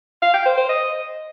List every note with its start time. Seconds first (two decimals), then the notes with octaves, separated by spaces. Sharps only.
0.22 F5
0.34 G5
0.46 C5
0.58 C5
0.69 D#5